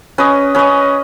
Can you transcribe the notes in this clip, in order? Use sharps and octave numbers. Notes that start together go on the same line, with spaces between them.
C#4 B4 D#5
C#4 B4 D#5